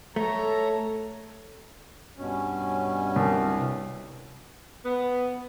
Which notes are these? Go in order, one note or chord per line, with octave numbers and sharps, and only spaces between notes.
A3 A4 C#5 A#5
G2 B2 C#4
C2
B3